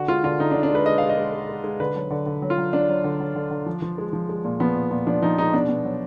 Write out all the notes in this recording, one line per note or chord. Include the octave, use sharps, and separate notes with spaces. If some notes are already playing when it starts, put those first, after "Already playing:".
Already playing: D3 F#4
G#3 F4
D3 F4
D3 D#4
D4
D3
D4
G#3 B4
G#3 D#5
G#3 F5
D#5
G#3
G#3
G#3
G#3
D3 B4
F#3
D3
D3
F#3
F4
F#3
F#3 D4
F#3
D3
F#3
D3
D3
F3
F3
G#3
F3
G#3
A#2
F3 B3
A#2
A#2
F3 D4
F3 D#4
G#3 D#4
B2 D4
B2
F#3